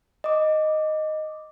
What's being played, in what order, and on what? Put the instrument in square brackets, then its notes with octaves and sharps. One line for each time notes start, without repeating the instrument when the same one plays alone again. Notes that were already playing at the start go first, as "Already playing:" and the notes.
[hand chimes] D#5 D6